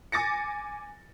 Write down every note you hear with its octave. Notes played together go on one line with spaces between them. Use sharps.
G#5 D6 A6 A#6 C#7